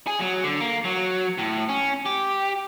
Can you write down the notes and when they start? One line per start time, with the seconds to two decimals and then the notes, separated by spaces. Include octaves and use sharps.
0.07 G#4
0.20 F#3
0.44 D3
0.60 A#3
0.85 F#3
1.38 A2
1.69 C#4
2.06 G4